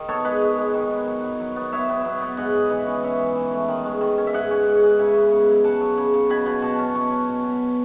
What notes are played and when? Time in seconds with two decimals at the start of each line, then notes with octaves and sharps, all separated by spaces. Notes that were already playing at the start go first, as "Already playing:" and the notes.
Already playing: D#3
0.09 B3 A4 C#5
0.25 G#3 B4 D#5
0.42 G#3
0.58 G#3
0.74 D#3
0.91 B3
1.07 F#3
1.24 F#3
1.40 F#3
1.56 B3
1.72 B3 C#5 E5
1.89 B3
2.05 F#3
2.22 B3
2.37 G#2 D#5 F#5
2.54 G#2
2.70 E3 B4 D#5
2.86 C#4
3.03 C#4 C#5 E5
3.19 E3
3.35 E3
3.52 A3
3.68 D#3
3.85 G#3
4.01 D#3
4.18 C#4
4.27 E5
4.33 G#2 D#5 F#5
4.51 C#4
4.67 G#2
4.83 G#3
4.99 C#3 E5 G#5
5.15 B3
5.31 C#3
5.49 F#3
5.64 C#3 F#5 A5
5.81 F#3
5.98 C#3
6.14 C#3
6.30 B2 G#5 B5
6.46 B2
6.62 B2 A5 C#6
6.79 C#4
6.95 B2 A5 C#6
7.11 C#4
7.29 B2
7.45 B2